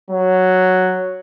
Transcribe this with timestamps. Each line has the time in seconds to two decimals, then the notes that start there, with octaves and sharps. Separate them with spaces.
0.10 F#3